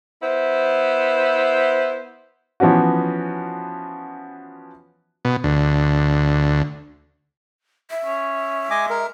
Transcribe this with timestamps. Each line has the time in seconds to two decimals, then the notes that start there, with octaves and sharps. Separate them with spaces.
0.23 B3 E4 C5
2.60 E3 F3 B3 C#4 F#4
5.25 B2
5.44 D2
7.91 E5
8.05 C#4
8.71 G#3 D#5 G#5 D6
8.90 A#4